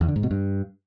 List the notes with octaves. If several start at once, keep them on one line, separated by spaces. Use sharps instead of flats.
E2
D3
G#2
B2
G2